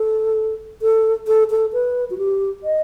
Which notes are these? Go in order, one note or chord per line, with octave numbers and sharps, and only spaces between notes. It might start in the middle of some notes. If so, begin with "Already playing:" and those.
Already playing: A4
A4
A4
A4
B4
F#4
G4
D#5